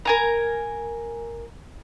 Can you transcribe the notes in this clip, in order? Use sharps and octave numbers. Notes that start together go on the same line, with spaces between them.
A#4 G#5 A#5